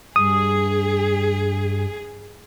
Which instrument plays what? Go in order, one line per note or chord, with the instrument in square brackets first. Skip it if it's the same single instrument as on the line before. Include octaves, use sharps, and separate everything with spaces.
[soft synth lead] G2 [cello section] G#4 [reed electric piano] D#6